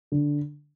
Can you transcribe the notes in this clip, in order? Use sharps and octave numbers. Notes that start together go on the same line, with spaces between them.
D3